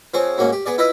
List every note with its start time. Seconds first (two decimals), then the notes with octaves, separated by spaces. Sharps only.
0.14 F3 C4 G#4 C5 C#5
0.38 G#2 F#3 A#3 C#4
0.52 G4
0.66 B3 G#4 D5
0.78 E4 F4 B4 D#5 E5